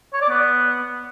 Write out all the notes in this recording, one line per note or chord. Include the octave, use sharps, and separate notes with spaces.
C#5
D5
B3